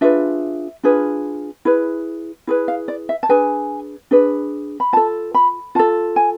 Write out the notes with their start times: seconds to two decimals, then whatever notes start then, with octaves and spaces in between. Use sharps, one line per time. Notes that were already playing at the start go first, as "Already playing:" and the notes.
0.01 D4 F4 G#4 B4 E5
0.83 D4 F4 G#4 B4
1.65 E4 G#4 B4
2.47 E4 G#4 B4
2.68 F5
2.88 D5
3.09 E5
3.23 A5
3.29 D4 G#4 B4 G#5
4.11 D4 G#4 B4
4.80 B5
4.93 F4 A4 A5
5.34 B5
5.75 F4 A4 A5
6.16 G#5